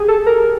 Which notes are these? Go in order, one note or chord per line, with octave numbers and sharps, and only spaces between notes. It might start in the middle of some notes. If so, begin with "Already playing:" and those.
Already playing: G4 G#4
A4
A#4